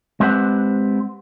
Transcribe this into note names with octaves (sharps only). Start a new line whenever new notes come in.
G#3 C4 G4 B4 C5 F#5